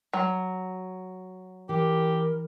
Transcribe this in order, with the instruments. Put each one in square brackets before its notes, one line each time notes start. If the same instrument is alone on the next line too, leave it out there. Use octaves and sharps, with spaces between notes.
[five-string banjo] F#3
[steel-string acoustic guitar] E3 [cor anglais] G4 [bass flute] A#4